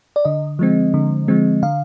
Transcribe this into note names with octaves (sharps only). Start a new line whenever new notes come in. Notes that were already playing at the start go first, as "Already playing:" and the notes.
D5
D3 D#5
F3 G#3 C4
D3
F3 G#3 C4
D3 F5